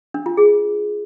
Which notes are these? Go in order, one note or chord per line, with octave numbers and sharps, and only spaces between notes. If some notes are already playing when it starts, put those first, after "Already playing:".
D4
F4
G#4